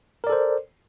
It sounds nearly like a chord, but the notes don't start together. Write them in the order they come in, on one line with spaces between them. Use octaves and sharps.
A#4 D5 A4 C5